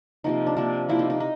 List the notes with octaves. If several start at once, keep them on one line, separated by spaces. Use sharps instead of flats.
C3 F3 A#3 D#4
D4
C3 F3 A#3 D4
C3 F3 A#3 E4
D#4
D#4
D#4